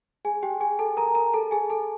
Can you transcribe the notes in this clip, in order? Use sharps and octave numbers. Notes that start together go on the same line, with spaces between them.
G#4 G#5
G4 G5
G#4 G#5
A4 A5
A#4 A#5
A#4 A#5
A4 A5
G#4 G#5
A4 A5